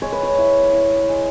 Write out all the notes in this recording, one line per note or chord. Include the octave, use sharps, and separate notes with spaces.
G#3 C#5
B4
C#5
E4
E4
G#3